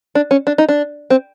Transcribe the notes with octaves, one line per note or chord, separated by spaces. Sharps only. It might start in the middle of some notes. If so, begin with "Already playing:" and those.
D4
C#4
D4
D#4
D4
C4